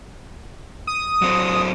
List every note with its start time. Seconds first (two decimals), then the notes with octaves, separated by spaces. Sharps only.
0.87 D#6
1.22 F#3 C4